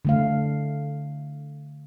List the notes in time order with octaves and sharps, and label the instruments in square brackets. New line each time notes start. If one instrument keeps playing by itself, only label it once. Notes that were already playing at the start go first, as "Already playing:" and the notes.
[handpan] D3 A3 F5